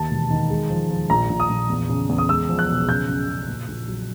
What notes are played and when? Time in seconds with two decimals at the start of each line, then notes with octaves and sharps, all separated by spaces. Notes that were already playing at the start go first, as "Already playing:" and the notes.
Already playing: D#2 A5
0.11 E1
0.30 D#3
0.50 G#3
0.70 F3
0.90 F3
1.10 A#1 A#5
1.29 A#1
1.40 D#6
1.49 A#1
1.70 E2
1.89 C#3
2.09 E2
2.18 D#6
2.29 G#3 E6
2.49 F3
2.59 F#6
2.69 B1
2.88 C#3 G6
3.08 F#2
3.28 C#3
3.48 A#2
3.68 A#1
3.88 F#3